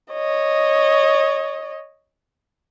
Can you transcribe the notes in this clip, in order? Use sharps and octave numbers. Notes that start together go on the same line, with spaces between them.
C#5 D#5